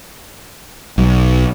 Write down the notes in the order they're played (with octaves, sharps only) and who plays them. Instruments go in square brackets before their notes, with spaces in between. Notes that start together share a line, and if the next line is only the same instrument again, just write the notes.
[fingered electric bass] B1